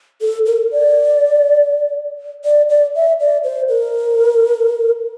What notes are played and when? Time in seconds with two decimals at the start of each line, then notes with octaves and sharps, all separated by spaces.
0.21 A4
0.46 A#4
0.71 D5
2.45 D5
2.69 D5
2.95 E5
3.20 D5
3.44 C5
3.69 A#4